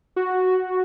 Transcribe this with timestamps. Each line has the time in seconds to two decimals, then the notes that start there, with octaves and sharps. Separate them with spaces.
0.16 F#4